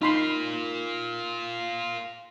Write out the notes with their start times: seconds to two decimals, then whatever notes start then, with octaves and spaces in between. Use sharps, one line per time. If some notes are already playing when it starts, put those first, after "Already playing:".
0.02 D#4 F4 A#4 B5 C6